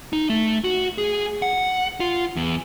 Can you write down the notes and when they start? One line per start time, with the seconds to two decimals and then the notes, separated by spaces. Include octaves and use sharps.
0.13 D#4
0.30 A3
0.64 F#4
0.98 G#4
1.42 F#5
2.00 F4
2.36 E2